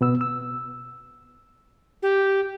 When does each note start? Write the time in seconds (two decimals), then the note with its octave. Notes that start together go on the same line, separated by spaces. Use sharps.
0.01 B2 B3 E6
0.21 E6
2.03 G4